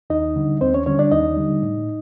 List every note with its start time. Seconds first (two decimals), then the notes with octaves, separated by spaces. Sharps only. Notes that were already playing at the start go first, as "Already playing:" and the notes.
0.10 D#2 D#4 D#5
0.36 D3 G3
0.61 D#2 C4 C5
0.74 C#4 C#5
0.86 D3 G3 C#4 C#5
0.99 D4 D5
1.11 D#2 D#4 D#5
1.37 D3 G3
1.62 A2